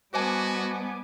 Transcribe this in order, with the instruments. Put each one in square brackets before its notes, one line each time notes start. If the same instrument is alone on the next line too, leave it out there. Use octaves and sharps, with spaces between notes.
[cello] G3 B3 [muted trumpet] F#4 [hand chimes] C5 D#5 A5 [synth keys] G#5 D6